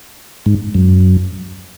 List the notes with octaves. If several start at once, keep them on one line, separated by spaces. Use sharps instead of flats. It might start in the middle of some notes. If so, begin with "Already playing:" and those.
G#2
F#2